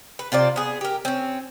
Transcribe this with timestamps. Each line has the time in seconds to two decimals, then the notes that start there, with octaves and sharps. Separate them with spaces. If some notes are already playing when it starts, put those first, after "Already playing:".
0.19 B4
0.32 C3 F4 C5 D5
0.56 B3 G#4
0.81 G4 A#4
1.05 C4 C#4